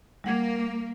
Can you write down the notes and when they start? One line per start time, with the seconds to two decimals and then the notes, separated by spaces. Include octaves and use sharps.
0.24 G3 A#3 F#5 G#6